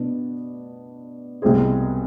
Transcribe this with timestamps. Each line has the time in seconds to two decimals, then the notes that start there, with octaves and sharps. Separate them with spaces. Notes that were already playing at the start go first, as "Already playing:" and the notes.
Already playing: B2 B3 D4
1.42 C2 B2 G#3 C4 G#4